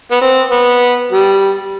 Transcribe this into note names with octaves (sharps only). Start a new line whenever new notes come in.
B3
C4
B3
G3